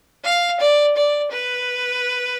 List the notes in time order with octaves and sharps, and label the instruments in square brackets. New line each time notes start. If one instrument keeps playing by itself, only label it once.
[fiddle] F5
D5
D5
B4